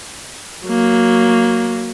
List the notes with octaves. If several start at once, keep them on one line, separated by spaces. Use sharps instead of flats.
F#3 A#3